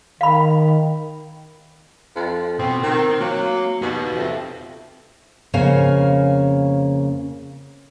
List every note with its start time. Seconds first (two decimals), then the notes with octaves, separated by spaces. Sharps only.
0.21 D#3 F5 B5
2.16 F2
2.59 B2 B3 C4
2.83 D#3 C4
3.20 F#3 A#3 F5
3.82 B2 D#4 G4
4.17 F2 C5 E5
5.54 F2 C#3 A#3 C#5 F5 G#5